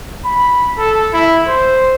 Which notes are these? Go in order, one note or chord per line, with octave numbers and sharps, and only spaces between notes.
B5
A4
E4
C5